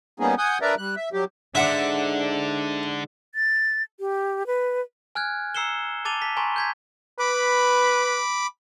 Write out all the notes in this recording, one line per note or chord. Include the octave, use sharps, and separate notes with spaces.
G3 A#3 B3 C#4 D#4 G#4
F#5 G#5 D#6 G6
D4 A#4 B4 D5 E5 A#5
G3 F#6
E5
F#3 G3 G4
G#2 D3 D4 E5 F#5 D6
A6
G4
B4
G#5 F6 F#6 G#6
A#5 E6 C7 C#7 E7 G7
A5 D6 A6 D#7 F7 G7
A5 B6
G#5 A#5 C6 C#6
G6 G#6 B6
B4 B5 D6